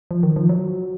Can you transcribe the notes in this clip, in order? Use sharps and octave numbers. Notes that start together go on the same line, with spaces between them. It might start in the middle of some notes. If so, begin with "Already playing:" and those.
F3
D#3
F3
F#3